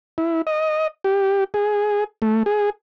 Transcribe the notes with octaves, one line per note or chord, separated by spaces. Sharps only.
E4
D#5
G4
G#4
A3
G#4